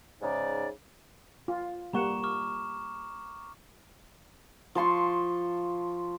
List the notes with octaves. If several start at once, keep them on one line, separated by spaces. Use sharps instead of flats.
G#2 C#3 D#4 D5
F4
G3 A#3 F#5 A#5 C#6 E7
C#6 D6 F6
F3 A5 C6 C#6